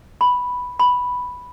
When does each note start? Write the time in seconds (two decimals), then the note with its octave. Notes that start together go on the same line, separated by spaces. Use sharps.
0.21 B5
0.79 B5